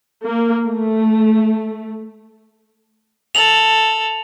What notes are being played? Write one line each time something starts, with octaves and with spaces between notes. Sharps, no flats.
A#3
A3
A4 F7 F#7